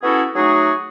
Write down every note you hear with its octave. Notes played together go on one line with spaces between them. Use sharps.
B3 C#4 E4 F#4 G#4 A4
F#3 A3 D#4 F#4 G#4